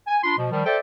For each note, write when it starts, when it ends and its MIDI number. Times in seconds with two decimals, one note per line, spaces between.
0.08 0.18 80
0.24 0.37 62
0.24 0.37 65
0.24 0.37 83
0.24 0.37 84
0.38 0.49 47
0.38 0.49 53
0.52 0.65 51
0.52 0.65 53
0.52 0.65 55
0.66 0.79 69
0.66 0.79 72
0.66 0.79 74
0.66 0.79 76
0.66 0.79 79